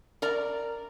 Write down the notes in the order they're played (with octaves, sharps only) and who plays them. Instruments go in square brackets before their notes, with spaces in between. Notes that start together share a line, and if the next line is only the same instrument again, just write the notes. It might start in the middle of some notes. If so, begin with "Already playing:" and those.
[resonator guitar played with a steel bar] A#4 D5 A#5